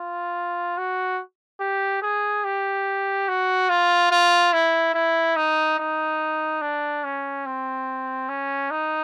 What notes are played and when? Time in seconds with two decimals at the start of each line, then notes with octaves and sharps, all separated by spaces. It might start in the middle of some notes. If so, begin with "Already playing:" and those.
Already playing: F4
0.77 F#4
1.60 G4
2.02 G#4
2.44 G4
3.28 F#4
3.69 F4
4.11 F4
4.53 E4
4.94 E4
5.36 D#4
5.79 D#4
6.61 D4
7.04 C#4
7.46 C4
8.29 C#4
8.71 D#4